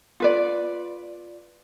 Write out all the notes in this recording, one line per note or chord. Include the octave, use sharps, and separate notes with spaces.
F4 B4 D5